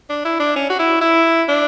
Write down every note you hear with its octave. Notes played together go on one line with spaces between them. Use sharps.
D4
E4
D4
C#4
F#4
E4
E4
D4